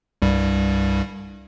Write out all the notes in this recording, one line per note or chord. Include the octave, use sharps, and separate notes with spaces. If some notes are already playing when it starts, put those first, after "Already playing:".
C2 G2 G3